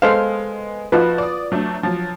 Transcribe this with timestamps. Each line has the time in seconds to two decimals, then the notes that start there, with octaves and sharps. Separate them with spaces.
0.02 G#3 B3 A4 C5 F5
0.92 F3 D#4 F4 F#4 B4
1.18 D5 D#6
1.52 F#3 A3 D4
1.83 F3 F#3